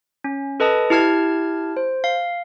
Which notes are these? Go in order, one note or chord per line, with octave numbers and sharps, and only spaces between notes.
C#4
A4 B4 D#5 A5 D#6
E4 G4 A5 F6 G#6
C5
F5